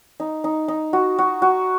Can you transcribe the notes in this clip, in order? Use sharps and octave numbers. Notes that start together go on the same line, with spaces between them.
D#4
D#4
D#4
F#4
F#4
F#4